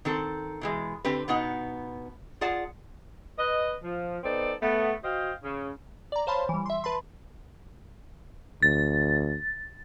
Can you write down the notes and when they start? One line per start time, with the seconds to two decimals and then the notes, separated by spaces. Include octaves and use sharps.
0.05 D#3 C4 A4
0.61 B2 E3 G#3
1.05 D3 C4 G4 B4
1.28 B2 B3 D#4 F#5
2.41 F4 G#4 D5 F#5 A5
3.38 B4 D#5
3.84 F3
4.23 B3 C4 D#4 A4 D5
4.61 A3 B3
5.04 F#4 C5 D#5 F5 G5
5.43 C#3
6.12 D5 A#5
6.27 C5 C#5 F5 A5 B5 C6
6.49 E3 G3
6.66 E5 C6
6.84 B4 A5 B5 C6
8.62 D2 A6